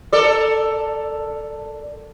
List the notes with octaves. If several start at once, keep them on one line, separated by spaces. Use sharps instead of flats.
A4 A#4 D5